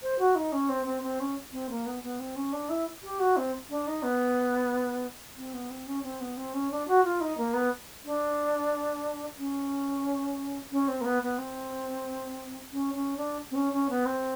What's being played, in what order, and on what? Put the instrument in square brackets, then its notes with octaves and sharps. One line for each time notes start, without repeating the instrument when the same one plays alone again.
[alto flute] C5
F#4
D#4
C#4
C4
C4
C4
C#4
C4
A#3
B3
B3
C4
C#4
D4
E4
G4
F#4
C4
D4
D#4
B3
C4
B3
C4
C#4
C4
B3
C4
C#4
D4
F#4
F4
D#4
A#3
B3
D4
C#4
C#4
C4
A#3
B3
B3
C4
C#4
C#4
D4
C4
C#4
C#4
B3
C4